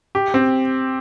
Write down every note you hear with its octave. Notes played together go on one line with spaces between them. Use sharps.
G4
C4